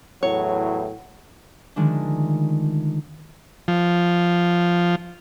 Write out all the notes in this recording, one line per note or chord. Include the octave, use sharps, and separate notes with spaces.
E2 A2 F#3 C#5
D3 D#3 F3 G#3 A3 D4
F3